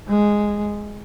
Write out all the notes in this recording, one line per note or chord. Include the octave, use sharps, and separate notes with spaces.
G#3